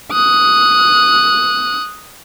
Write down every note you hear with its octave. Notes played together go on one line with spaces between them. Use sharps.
D#6 F#6